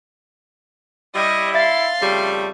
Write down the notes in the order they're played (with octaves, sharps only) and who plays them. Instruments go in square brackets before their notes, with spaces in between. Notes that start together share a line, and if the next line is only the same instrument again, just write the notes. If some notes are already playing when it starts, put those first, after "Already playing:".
[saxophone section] G3 [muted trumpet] E4 [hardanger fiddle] D#5
[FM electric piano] E5 A6 [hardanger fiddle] F5 C6
[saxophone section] F2 C#3 G3 [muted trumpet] A3